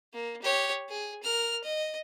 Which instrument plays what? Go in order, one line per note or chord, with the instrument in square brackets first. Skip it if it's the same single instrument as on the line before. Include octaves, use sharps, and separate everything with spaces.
[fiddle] A#3
G4 C#5
G#4
A#4 F6
D#5